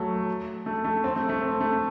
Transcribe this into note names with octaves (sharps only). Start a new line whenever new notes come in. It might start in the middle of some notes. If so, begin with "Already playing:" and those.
Already playing: F#3 A3
A3
A3
C4
A3
A3
C4
A3